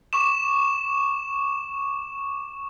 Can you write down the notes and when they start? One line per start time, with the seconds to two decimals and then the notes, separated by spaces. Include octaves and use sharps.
0.13 C#6 D6 E7